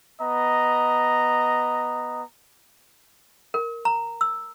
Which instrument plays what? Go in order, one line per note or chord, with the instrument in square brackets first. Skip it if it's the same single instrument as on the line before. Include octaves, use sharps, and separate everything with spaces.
[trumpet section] B3 D#5 A#5
[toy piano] A#4
A#5
E6